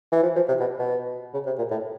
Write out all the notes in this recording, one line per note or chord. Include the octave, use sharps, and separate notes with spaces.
E3
F3
F3
C3
B2
B2
C#3
C3
A#2
A2